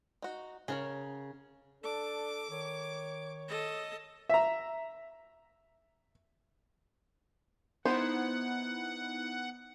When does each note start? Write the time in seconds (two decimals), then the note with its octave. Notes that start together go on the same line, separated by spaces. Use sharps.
0.22 D#4 F#4
0.68 C#3 G#4 A#4 C#5
1.84 D4 A4 D6
2.51 D#3 C#5
3.48 A4 D#5
4.29 E5 A#5
7.85 B3 D#4 E4 C5 F#5